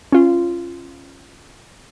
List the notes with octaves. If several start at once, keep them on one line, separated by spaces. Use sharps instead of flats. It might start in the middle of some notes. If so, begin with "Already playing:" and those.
C#4 F4